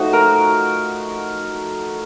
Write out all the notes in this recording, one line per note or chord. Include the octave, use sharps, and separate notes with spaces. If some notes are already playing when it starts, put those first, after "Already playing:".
Already playing: F3 A3 D#4 F#4
A#4